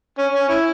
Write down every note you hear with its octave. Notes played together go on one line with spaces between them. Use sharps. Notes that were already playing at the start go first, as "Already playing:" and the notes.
C#4
C#4
E4